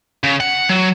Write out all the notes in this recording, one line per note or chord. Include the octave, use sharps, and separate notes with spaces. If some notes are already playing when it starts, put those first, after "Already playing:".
C#3
F#5
F#3